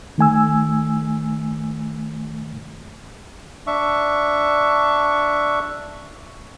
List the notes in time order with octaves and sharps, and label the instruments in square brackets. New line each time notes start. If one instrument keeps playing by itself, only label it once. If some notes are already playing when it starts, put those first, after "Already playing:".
[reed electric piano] D#3 A3 G#5 E6
[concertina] D4 E5 C#6